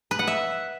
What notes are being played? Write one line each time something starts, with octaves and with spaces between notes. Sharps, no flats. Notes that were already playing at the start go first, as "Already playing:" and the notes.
B4
F#5
E5